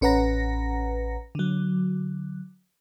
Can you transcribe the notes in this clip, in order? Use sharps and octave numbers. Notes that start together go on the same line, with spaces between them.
A1 C#4 B4 F#5 A#5 A#6
D3 F#3